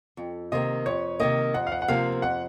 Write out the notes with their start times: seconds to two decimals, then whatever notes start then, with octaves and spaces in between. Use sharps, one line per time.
0.17 F2
0.52 C3 D#3 A#3 D#5
0.86 F2 C#5
1.20 C3 D#3 A#3 D#5
1.54 F2 F#5
1.67 F5
1.72 F#5
1.82 F#5
1.88 C3 F3 A#3 F5
2.22 F2 F#5